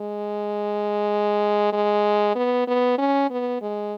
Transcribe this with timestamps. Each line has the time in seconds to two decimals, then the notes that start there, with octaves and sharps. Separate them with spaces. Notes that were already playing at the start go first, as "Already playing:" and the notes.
Already playing: G#3
1.72 G#3
2.35 B3
2.67 B3
2.98 C#4
3.30 B3
3.61 G#3